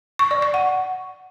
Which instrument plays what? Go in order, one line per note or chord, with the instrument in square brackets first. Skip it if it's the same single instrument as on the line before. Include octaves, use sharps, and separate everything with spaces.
[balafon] C#6
D5
C#6
F#5